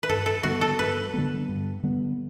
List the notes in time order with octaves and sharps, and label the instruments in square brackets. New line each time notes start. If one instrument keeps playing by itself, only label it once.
[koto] B4
[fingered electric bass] G2 [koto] A4
[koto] A4
[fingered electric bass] D3 G3 B3 [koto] F#4
[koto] A4
[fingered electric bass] G2 [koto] B4
[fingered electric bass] D3 G3 B3
G2
D3 G3 B3